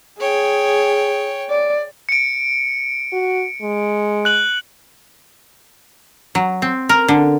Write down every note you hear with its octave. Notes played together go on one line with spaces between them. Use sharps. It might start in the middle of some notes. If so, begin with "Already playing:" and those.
G#4 C#5 G5
D5
C#7 D7
F#4
G#3
F#6 F#7
F#3
C4
A#4
D3